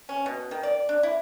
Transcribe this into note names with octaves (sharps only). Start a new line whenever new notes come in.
C#4
B2
D#3
D5
D4
E4